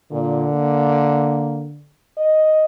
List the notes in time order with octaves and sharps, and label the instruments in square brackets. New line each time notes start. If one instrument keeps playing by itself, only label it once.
[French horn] A#2 [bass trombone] D3
[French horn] A#3
D#5